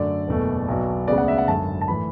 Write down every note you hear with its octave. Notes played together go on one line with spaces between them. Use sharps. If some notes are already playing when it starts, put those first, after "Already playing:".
Already playing: F#2 D3 A3 D5
F#1 E2 B2 A3
B1 B2 F#3 B3
D2 C#3 G#3 B3 D5
F#5
E5
F#5
G#1 F#2 D3 A5
A5
A2 E3 A3 B5